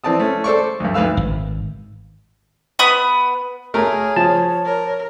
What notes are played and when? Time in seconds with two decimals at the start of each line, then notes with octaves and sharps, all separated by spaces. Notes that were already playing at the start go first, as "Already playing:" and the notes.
0.04 E3 C4 D5 A5 D#6
0.19 A3 C#4
0.44 A4 C5 D5 C#6
0.80 D2 G2
0.94 D2 G#2 B4 F5 E6
1.17 G#1
2.79 B3 B5 D#6
3.74 A3 G#4 A#4 C#5
4.16 F3 A5
4.65 A#4